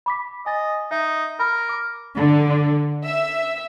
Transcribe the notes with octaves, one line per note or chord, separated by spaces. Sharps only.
B5 D6 B6
D#5 G#5 A6
D#4 E5
A#4 B5
D6
D3
E5